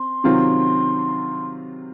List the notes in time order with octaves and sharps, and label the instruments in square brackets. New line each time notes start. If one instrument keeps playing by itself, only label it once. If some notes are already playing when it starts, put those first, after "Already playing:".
Already playing: [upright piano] C4 [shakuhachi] C6
[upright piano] C3 D#3 F#3 C4 F4